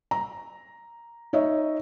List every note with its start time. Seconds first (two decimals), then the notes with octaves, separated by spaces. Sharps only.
0.11 A#5
1.33 D#4 C#5 D#5 E5